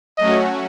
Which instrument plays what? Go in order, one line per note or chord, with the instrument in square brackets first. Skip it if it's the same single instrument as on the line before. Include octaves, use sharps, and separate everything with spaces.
[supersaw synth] F#3 A3 C#4 F#4 [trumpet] D#5